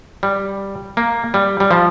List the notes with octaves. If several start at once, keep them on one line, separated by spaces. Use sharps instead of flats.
G3
A#3
G3
G3
F3